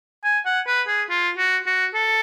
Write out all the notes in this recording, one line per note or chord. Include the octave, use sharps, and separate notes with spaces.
G#5
F#5
B4
G#4
F4
F#4
F#4
A4